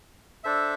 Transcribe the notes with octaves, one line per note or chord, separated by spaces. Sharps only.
D4 A4 C5 E5